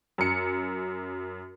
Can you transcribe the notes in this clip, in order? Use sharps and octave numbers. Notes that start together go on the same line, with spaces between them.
F#2 C#7